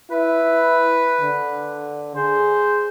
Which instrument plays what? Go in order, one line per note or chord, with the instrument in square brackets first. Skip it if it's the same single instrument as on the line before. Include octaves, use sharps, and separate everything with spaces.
[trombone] E4 [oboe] B4
[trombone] D3
[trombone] G#4 [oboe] C5